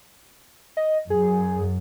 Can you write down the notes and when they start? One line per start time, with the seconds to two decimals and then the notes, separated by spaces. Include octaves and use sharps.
0.77 D#5
1.10 F#2 G#4